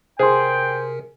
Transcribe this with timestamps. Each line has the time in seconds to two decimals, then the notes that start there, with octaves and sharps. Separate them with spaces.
0.19 C3 G#4 A#4 C5 G5 C6